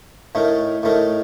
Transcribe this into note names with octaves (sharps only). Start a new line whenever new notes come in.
A2 A3 D#4 A#4
A2 A3 D#4 A#4